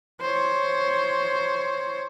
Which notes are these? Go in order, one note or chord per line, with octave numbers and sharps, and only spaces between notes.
C5 C#5